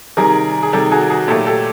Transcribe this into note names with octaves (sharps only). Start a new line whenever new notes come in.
C3 D#3 G3 G#4 A#4
G#4
C3 D#3 G3 G4 A4
F#4 G#4
F#4 G#4
A#2 F#3 A3 G4 A4
G4 A4